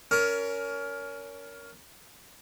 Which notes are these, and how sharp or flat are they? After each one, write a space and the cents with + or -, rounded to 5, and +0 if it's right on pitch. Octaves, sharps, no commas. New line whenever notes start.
C#4 +25 A#4 +0 C#6 +30